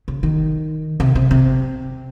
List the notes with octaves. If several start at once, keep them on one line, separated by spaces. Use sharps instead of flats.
C#3
D#3
C3
C3
C3